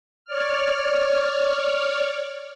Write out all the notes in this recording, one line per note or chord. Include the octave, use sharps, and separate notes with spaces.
C#5 D5 F6